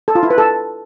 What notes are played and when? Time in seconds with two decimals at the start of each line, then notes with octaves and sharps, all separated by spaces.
0.08 A4
0.15 F4
0.23 E4
0.30 B4
0.38 A4